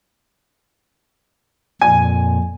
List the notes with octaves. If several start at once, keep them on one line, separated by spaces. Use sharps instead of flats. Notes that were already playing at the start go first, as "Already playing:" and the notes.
F2 A#2 G#5